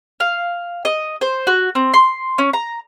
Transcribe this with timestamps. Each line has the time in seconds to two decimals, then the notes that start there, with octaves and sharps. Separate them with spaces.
0.20 F5
0.85 D#5
1.21 C5
1.47 F#4
1.75 C4
1.94 C6
2.38 C#4
2.53 A#5